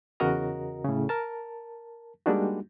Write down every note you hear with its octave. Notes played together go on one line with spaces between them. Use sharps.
E2 C#3 F#4 A#4 D#5 A#5
A2 C#3
A#4 A5
G3 G#3 A#3 D4 D#4 F#4